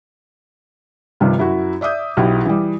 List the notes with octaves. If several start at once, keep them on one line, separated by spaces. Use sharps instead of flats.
G2 C3 D#3 F3 G3
F#2 E4 F#4
D5 E5 D6 D#6 G6
B1 E4 G4
E3 G3